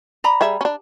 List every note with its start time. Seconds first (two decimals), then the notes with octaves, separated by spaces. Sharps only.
0.24 D5 A#5 B5
0.41 G3 G#4 E5
0.61 C#4 D4